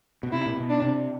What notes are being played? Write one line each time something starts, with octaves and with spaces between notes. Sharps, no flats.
B2
C3 E4
A#2
B2
D4
C3